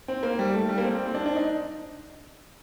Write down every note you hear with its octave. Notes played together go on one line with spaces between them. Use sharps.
C4
A#3
G3
A3
G3
A#3
C4
C4
D4
D4
D#4